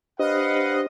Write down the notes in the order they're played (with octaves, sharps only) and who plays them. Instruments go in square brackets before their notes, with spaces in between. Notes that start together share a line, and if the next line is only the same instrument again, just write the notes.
[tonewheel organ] D4 G4 C5 [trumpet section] B4 F5 F#5 [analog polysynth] D#5